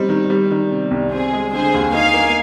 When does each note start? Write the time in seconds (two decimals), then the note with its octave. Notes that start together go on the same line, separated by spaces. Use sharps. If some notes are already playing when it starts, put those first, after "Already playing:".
Already playing: G3 C4 D#4
0.09 D#3
0.30 G3
0.51 D#3
0.71 C3
0.91 C2
1.12 C4 G#4
1.33 G#3
1.53 D3 G#4 C5
1.74 D#2
1.94 D#4 F5 G#5
2.14 A#3